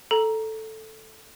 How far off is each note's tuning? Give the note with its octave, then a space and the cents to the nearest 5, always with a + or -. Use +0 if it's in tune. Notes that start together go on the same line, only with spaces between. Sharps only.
A4 +0 A#5 +5